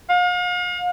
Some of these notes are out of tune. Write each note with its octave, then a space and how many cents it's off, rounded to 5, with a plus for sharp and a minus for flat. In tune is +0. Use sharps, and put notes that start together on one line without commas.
F5 +40